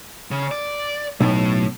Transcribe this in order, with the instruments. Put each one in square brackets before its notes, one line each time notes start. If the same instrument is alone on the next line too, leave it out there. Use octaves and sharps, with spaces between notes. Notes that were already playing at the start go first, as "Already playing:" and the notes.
[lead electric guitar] C#3
D5
[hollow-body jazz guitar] B1 [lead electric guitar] A2